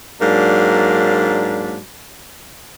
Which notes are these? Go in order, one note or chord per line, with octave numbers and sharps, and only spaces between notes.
G#2 F#3 A#3 D4